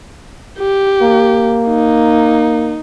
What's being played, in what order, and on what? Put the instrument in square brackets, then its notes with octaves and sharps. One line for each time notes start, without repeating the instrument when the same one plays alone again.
[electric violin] G4
[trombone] A#3
[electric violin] D#4